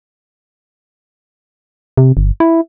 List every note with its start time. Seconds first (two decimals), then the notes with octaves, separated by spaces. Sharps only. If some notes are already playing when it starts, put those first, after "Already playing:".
1.97 C3
2.17 G1
2.40 E4